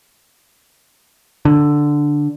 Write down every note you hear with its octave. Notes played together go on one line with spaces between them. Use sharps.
D3